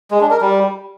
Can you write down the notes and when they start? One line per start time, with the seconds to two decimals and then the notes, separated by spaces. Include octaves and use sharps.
0.11 G#3
0.21 D4
0.31 A#4
0.41 G3